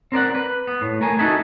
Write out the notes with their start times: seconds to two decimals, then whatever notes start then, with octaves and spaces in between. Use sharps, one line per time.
0.12 C4 A#4 D5 F#5
0.35 B4
0.67 B3
0.81 A2
1.01 A3 A#4 G#5
1.19 D#4 F#4 A4 D#5 E5 G#5